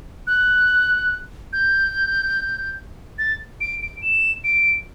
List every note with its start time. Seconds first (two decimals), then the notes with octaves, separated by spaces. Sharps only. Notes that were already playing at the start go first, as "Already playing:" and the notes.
0.27 F#6
1.53 G6
3.18 A6
3.61 D7
3.82 D7
4.02 E7
4.44 D7